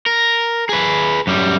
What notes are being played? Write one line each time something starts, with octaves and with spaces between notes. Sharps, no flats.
A#4
G#4 B4
F#2 G3